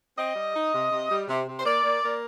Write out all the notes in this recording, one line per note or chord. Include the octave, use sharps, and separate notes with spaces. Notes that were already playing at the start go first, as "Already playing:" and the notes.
C4 D#5
G3
D#4
C3
C3
G3
C3
C3
C5
A#3 D5
A#3
A#3